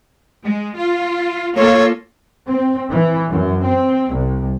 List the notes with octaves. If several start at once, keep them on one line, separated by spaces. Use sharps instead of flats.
G#3
F4
A#3 F4 A4 C#5
C4
E3
F#2
C4
C2